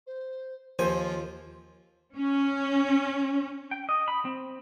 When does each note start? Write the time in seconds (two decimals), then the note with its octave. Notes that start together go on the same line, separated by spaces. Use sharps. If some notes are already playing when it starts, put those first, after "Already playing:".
0.06 C5
0.79 D#2 F3 F4 C5 G#5
2.14 C#4
3.71 G5
3.89 D#5
4.08 B5
4.25 C4